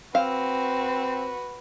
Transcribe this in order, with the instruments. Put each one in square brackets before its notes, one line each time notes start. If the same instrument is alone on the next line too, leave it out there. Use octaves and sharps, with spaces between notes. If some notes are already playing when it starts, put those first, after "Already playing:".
[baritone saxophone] C4 [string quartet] F#4 B4 [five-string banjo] F5